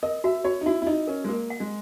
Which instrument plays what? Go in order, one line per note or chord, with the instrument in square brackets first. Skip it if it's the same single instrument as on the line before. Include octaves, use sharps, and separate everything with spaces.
[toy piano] A#4 [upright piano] D#5
[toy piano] F#4 [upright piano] E5
[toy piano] F#4 [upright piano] C#5
[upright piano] D#4
[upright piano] E4 [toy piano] F#4
[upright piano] E4
[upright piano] D#4 [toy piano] D#5
[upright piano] C#4 [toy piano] A#4
[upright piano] G#3
[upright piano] A#3 [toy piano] A#4
[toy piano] F#5
[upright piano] G#3